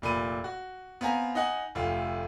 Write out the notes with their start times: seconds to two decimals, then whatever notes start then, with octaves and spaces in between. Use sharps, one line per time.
0.02 F1 A#2 B5 D#7
0.44 F#4
1.01 B3 C4 F5 G#5 A#5
1.35 D#4 D#5 F#5 G#5
1.75 F1 D2 F4